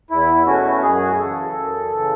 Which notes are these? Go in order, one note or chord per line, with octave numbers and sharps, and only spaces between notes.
E2 E4
B2 A3 C#4 F#4
F#2 G#4
F#4
G#4
C#3 E3 A4
F#2
C#3 E3